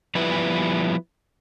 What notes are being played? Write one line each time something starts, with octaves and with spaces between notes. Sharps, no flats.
F3 G3 B3 E4 B4